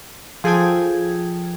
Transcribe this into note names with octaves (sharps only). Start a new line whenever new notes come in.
F3 G#4 A4 G5 G#5 G#6